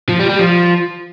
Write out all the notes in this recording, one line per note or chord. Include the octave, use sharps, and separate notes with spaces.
F3
G3
G3
F3